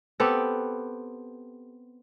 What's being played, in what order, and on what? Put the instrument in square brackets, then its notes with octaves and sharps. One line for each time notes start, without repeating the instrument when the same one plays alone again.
[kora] B3 C4 G4 A4